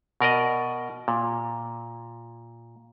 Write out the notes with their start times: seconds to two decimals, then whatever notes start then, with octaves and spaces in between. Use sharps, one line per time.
0.21 B2 A#4 D5 D#5
1.08 A#2